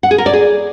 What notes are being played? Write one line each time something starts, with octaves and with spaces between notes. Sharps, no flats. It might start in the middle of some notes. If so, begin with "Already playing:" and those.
F#5
G#4
A#4
D5
G#4